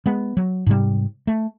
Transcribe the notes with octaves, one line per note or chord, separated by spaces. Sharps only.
G#3 B3
F#3
G#2 C3 G3
A3